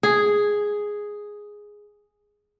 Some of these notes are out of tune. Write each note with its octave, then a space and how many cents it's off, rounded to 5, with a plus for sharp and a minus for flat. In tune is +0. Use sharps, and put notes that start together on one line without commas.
G#4 +0